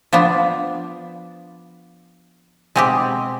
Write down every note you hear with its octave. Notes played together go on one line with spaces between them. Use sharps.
F3 B3 D4
B2 G#3 C4 G4